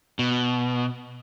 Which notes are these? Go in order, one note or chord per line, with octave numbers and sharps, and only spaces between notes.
B2